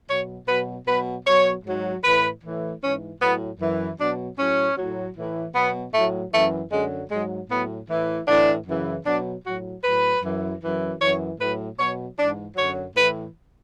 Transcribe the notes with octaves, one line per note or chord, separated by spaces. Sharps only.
B2 F#3 C#5
B2 F#3 B4
B2 F#3 B4
B2 F#3 C#5
G#2 F#3
A2 E3 B4
A2 E3
G#2 E3 C#4
A2 F#3 B3
F#2 E3
B2 F#3 D4
A2 F#3 C#4
A2 F#3
A2 E3
B2 F#3 B3
A2 F#3 A3
F#2 E3 A3
F#2 D3 F#3 G#3
G#2 F#3 G#3
A2 F#3 B3
A2 E3
A2 E3 D4
F#2 C#3 E3
B2 F#3 D4
A2 F#3 F#4
A2 F#3 B4
F#2 E3
F#2 E3
F#2 E3 C#5
A2 F#3 B4
B2 F#3 C#5
G#2 E3 D4
F#2 D3 F#3 C#5
A2 E3 B4